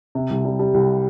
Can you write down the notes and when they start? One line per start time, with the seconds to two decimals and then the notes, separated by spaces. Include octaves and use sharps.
0.15 C3
0.30 C2
0.45 G3
0.59 G3
0.74 C2